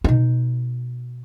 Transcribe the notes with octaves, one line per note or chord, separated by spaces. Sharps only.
B2 D#4